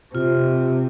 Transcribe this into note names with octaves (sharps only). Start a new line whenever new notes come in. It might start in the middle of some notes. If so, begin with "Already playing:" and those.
C3 F4